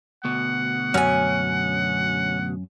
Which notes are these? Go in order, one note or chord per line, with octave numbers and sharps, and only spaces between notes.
D2 B2 F#5
F#2 C#4 G#5